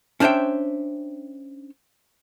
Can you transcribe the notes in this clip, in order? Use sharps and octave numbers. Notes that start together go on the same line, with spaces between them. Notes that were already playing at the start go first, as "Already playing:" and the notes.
C#4 D4 C5 C#5 E5 G5